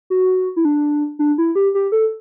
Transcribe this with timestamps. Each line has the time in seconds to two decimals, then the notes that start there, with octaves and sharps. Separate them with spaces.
0.10 F#4
0.56 E4
0.65 D4
1.19 D4
1.38 E4
1.55 G4
1.75 G4
1.92 A4